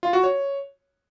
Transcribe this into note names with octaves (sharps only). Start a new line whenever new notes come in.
F4
F#4
C#5